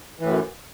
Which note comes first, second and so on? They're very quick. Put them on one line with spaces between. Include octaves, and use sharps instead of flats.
E3 A2 F#2